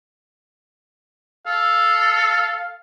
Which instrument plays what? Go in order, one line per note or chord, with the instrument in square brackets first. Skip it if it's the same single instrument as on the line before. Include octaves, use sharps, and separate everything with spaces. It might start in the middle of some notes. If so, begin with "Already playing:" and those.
[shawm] A4 [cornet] F5